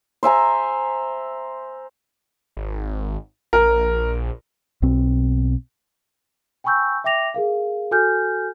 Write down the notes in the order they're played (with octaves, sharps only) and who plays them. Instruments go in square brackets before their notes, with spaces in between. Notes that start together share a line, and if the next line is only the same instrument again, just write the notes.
[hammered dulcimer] C5 E5 G#5 A#5
[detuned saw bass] G#1
[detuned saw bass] A#1 [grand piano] A#4
[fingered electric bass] B1 B2 C4
[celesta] G5 G#5 B5 C#6 E6 G6
E5 G5 D6 A#6 F7
G#4 A#4 F5
F#4 A4 G#5 F6 G6